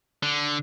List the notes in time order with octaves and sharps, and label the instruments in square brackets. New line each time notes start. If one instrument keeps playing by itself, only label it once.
[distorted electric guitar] D3